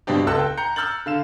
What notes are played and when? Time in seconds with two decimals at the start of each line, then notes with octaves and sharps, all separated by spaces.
0.07 G2 B2 C4 D4 G4
0.27 C#2 A4 A5 E6 F#6
0.39 G5
0.57 A#5 G6 C#7
0.76 E6 F6 G6 A6 F#7
1.06 D3 F5 E7